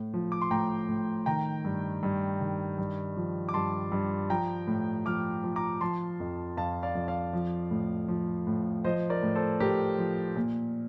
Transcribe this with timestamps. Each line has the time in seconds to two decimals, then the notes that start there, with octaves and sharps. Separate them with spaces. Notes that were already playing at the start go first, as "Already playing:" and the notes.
Already playing: A2
0.14 F3
0.32 D6
0.42 C6
0.51 A2 G5 A#5
0.89 A2
1.26 D#3 G5 A#5
1.65 G2
2.03 G2
2.41 D#3
2.78 G2
3.17 F3
3.49 D6
3.54 G2 A5 C6
3.92 G2
4.30 F3 G5 A#5
4.67 A2
5.06 F3 D6 F6
5.44 F3
5.56 A#5 D6
5.81 F3 A5 C6
6.20 F2
6.57 F2 F5 A5
6.83 D5 F5
6.95 F2
7.08 D5 F5
7.33 F3
7.71 A2
8.08 F3
8.47 A2
8.84 F3 C5 D#5
9.10 A#4 D5
9.23 A2
9.35 A4 C5
9.60 A2 G4 A#4
9.98 F3
10.36 A#2